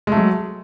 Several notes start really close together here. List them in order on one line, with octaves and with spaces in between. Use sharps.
G#3 A3 F#3